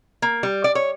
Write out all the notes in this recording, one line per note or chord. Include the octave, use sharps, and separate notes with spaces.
A#3
G3
D5
C#5